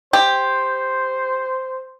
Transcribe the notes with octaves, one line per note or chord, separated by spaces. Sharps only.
G4 C5